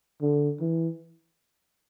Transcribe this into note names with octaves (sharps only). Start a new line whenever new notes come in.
D3
E3